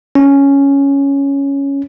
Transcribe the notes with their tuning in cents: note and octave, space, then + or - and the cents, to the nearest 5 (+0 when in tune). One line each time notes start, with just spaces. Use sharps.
C#4 +5